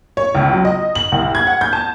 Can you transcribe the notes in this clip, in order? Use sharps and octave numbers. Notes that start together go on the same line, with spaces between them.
C#5
C#2
F#3
D#5
F#7
C2
G#6
F#5
G6
A5